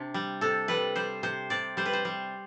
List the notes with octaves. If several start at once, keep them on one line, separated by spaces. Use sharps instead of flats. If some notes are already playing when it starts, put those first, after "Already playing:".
Already playing: C3 D4
G3
C3 A4
G3 B4
G3 C5
C3 C5
C3 D5
G3 C5
B4
C5
G3